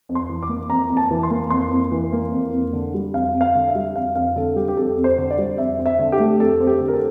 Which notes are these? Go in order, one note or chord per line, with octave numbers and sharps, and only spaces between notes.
F2
C6
E3
D6
A#3
F2 A#5
F2
A5
E3
C6
A#3
F2 C6
F2
E3
A#3
F2
F2
D3
G3
F2 F5
F2
F5
D3
E5
G3
F2 F5
F2 F5
D3 A4
G3 G4
G4
F2 A4
F2
C5
D3
D5
G3
F2 E5
C4
E5
D3
G4
A3
F2 A4
C4
G4
D3
A#4
A4